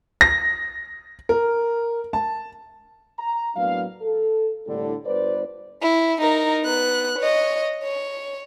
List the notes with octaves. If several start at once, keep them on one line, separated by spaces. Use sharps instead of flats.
A#6
A#4
A5
A#5
A2 F#3 A#3 B3 D4 F5
A4
C2 A2 D3 G3 D4 A4
G1 B4 C5 D5
E4
D#4 A#4
B3 F#6
C#5 D#5
C#5